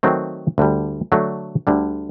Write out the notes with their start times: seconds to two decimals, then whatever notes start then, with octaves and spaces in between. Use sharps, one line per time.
0.03 D#3 F#3 A3 C4
0.58 D2 D3 G3
1.12 D3 F#3 A3 D4
1.67 D2 D3 G3